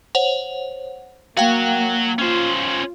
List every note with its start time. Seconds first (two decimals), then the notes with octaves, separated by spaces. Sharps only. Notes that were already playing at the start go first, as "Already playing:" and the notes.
0.15 C5 C#5 F#5
1.37 F#3 A#3 F#4 F5 G5
2.19 C#4 F4 C5